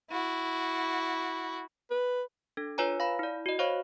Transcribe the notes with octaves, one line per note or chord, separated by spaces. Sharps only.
E4 F#4
B4
D4 A4
F4 B4 C#5 G#5 A#5
F5 B5
E4 D5
F#4 D#5
C5 C#5 F5 B5 C#6